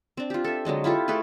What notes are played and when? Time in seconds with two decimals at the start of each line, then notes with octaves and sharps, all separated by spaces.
0.17 C4 D4
0.30 F4 G4
0.44 A4 E5
0.65 D3 F#3 G#3 D#5
0.84 E4 F4 G4 A4
1.08 A3 G#4 A4 B4